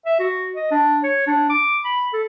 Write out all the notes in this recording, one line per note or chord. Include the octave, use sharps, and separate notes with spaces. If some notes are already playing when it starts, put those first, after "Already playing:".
E5
F#4
D#5
D4
C#5
D4
D6
B5
A4